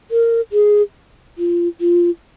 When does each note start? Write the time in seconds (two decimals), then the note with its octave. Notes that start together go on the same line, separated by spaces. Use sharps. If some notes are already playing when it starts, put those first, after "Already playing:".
0.11 A#4
0.52 G#4
1.38 F4
1.80 F4